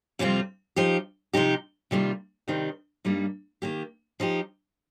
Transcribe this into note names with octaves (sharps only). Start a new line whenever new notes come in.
F2 C3 G3 C4 F4
F3 D#4 G4
C3 F3 D#4 G4
C3 D#3 G3 A#3 F4
C3 D#3 G3 C4
G2 G3 A#3 D#4
D#3 A#3 G4
F3 D#4 G4